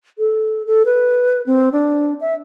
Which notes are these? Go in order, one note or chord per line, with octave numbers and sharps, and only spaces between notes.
A4
A4
B4
C4
D4
E5